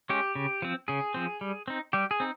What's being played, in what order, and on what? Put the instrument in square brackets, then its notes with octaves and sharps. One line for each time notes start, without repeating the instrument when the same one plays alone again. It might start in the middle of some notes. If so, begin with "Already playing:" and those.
[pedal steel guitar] G#3 C#4 G4
C#3
F3 C4
C#3 G#4
F3 C4
G3
C4 D#4
G3 G4
G#4
C4 D#4